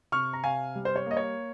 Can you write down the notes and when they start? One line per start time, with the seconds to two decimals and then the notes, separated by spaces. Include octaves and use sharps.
0.12 C3 C#6 F6
0.33 A#5
0.44 C3 F5 G#5
0.75 G3
0.85 C5
0.96 C#5
1.06 A#3 D#5
1.17 C#5